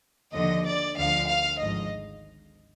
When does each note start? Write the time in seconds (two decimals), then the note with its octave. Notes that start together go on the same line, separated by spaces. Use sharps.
0.33 D#2 D3 F3 D#5
0.65 D5
0.97 D2 D3 F3 F5
1.29 F5
1.60 G#1 G#2 F3 D#5